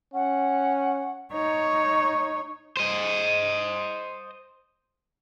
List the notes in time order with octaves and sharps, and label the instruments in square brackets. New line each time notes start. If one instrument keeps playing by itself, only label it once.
[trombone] C#4 [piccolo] F#5
[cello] D#4 C#5
[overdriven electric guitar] C5 D#5